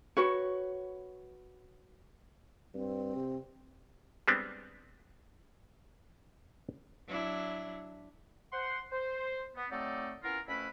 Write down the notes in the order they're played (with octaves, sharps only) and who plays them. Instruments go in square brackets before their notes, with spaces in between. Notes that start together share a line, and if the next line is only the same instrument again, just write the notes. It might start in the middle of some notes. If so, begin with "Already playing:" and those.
[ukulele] F#4 B4 C#5
[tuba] G2 [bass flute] C4
[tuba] C3
[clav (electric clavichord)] G3 G#3 B3 C4 D4
[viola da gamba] F#3 D4 E4
[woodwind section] C5 F#5 C6
C5
B3
F#3 A3 C4 D#4 A4 D5
B3 C#4 E4 F4 A#4
F2 A3 C#4 E4 B4 B5